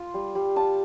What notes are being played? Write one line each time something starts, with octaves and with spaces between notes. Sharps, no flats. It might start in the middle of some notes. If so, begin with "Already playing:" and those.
Already playing: F4 C6
G3
G3
F4 A5